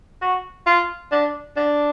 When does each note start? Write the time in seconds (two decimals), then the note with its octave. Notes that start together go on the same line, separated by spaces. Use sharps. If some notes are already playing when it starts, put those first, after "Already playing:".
0.22 F#4
0.66 F4
1.12 D4
1.57 D4